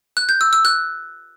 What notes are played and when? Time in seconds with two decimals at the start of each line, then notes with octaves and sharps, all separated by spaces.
0.17 F#6
0.29 G6
0.41 E6
0.53 E6
0.65 F#6